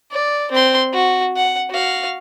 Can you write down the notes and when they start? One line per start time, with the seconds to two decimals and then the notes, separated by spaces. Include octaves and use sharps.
0.12 D5
0.52 C4 C6
0.93 F#4
1.36 F#5
1.71 F#4 F5